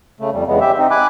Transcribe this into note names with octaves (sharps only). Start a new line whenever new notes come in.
C#3 A3
F2 G3
E2 C#3 G#3 B3
G4 E5
C4 D#4
G#5 B5 D6 F#6